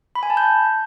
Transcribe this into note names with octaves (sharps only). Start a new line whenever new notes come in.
B5
G#5
A5
G6